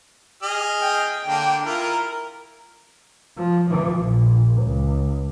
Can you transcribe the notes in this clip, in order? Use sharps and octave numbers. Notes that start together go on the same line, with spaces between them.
G#4 D#5 F6
G5
D3 A#3 D4
E4 F4 A#4
F3
F3
A#1
C#2